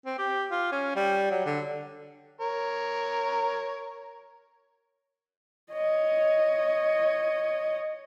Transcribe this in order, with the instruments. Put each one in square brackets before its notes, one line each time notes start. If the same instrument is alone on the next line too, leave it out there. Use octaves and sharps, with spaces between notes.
[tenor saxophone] C4
G4
F4
C#4
G3
F#3
D3
[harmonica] A#4 C#5
[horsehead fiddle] C#5 D#5